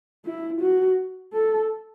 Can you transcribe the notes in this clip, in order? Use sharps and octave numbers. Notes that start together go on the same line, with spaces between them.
E4
F#4
A4